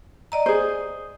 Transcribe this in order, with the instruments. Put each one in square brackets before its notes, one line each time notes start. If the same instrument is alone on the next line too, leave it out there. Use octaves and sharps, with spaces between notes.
[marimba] D5 D#5 A#5
[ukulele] G#4 C5